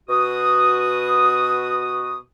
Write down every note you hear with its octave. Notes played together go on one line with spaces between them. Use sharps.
B2 F#4 D#6